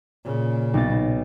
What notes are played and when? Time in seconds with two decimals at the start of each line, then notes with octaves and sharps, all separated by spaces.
0.25 A#2 C#3
0.74 B1 A6